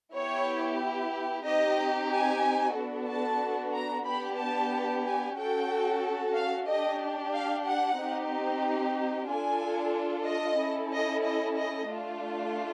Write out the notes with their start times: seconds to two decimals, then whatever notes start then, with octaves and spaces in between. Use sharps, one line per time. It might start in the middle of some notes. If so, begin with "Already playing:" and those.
0.14 B3 E4 G4 C#5
1.45 C4 D#4 G4 D#5
2.10 G#5
2.75 B3 D4 F#4 A4
3.08 A5
3.74 A#5
4.06 B3 D4 G4 B5
4.38 A5
5.04 G#5
5.37 C#4 F#4 A4 G5
6.35 F5
6.67 D4 G4 D#5
7.32 F5
7.65 F#5
7.98 C4 D#4 G4
9.28 D4 F4 A4 G#5
10.26 D#5
10.59 C#4 E4 A4
10.92 D#5
11.24 D#5
11.56 D#5
11.89 A3 D4 F4